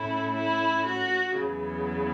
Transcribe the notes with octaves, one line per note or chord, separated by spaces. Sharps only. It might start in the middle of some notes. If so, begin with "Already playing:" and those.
Already playing: A2 A3 C#4 E4
E4
F#4
E2 C#3 F#3 B3